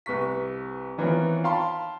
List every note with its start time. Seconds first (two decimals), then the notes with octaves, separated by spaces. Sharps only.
0.06 C2 B4 C#6 B6
0.98 D#3 E3 B3 C4 F4 C#5
1.44 F5 G5 A5 B5 C6